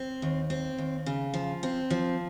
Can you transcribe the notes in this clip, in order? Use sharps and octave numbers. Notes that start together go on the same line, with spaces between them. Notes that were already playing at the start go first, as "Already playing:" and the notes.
Already playing: C4
D#2
C4
D#2
C#3
F3
C4
F3